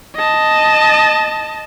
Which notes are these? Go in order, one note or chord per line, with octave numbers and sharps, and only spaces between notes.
D#5 A5